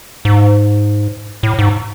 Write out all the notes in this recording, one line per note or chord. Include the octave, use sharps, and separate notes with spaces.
G#2
A2
G#2